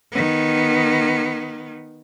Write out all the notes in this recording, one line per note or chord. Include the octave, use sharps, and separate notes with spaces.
D#3 B3